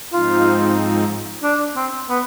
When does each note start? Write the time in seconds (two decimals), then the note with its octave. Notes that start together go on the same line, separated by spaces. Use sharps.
0.12 G#2 F3 C4 D#4 F4
1.43 D4
1.76 C4
2.09 B3